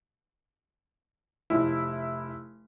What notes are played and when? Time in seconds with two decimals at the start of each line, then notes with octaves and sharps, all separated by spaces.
1.50 F1 E4